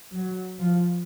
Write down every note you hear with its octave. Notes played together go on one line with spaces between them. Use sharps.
F#3
F3